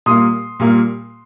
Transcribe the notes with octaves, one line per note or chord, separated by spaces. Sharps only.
A#2 G3 A#3 C6 D#6
A#2 G3 A#3